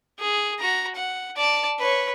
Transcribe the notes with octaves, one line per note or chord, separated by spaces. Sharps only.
G#4
F#4 A#5
F#5
D5 A5
B4 C#5